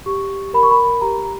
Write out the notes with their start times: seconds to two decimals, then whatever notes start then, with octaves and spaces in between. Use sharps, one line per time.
0.06 G4 C#6
0.54 A#4 B5
0.63 C#6
0.71 B5
1.01 G4 A#5